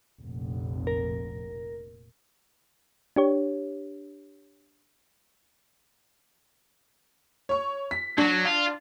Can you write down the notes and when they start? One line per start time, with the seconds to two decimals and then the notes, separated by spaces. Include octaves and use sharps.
0.21 F1 A#1
0.87 A#4
3.16 D4 G4 C#5
7.49 C#5 C#6
7.91 B6
8.18 F#3 D4
8.45 F4